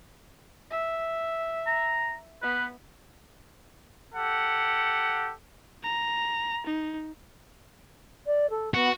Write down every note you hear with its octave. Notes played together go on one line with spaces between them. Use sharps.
E5
A#5
B3 B4
G4 A4 F#5
A#5
D#4
D5
A4
B3 F#4